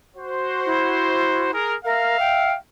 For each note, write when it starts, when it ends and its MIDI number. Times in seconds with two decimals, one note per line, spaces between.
0.16 1.49 66
0.16 1.49 72
0.66 1.52 64
1.53 1.76 68
1.53 1.76 70
1.85 2.17 70
1.85 2.56 76
1.85 2.56 77
2.19 2.52 79